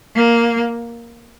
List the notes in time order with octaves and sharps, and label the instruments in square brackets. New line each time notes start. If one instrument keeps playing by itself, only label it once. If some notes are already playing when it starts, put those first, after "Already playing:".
[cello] A#3